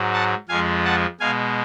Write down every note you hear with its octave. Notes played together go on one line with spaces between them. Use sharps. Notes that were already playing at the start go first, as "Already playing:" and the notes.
Already playing: G#2 F#3
F#5 A5
F2 F3 G#3 F5 G#5
F#5 A5
B2 G#3 F5 G#5